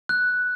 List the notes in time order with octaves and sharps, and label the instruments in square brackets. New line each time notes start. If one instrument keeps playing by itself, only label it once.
[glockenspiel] F#6